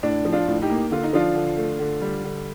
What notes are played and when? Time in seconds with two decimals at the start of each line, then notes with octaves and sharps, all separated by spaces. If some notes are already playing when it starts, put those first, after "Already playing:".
0.03 A2 D4
0.25 F3
0.32 D4 F4
0.47 A2
0.62 D#4 G4
0.70 A#3
0.91 D3 F4
1.03 D#4
1.13 F3 D4 F4
1.35 D3
1.57 A3
1.79 D3
2.02 G3
2.24 D3